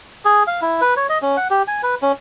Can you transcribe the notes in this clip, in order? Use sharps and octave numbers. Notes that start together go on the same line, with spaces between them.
G#4
F5
E4
B4
C#5
D#5
C#4
F#5
G4
G#5
B4
C#4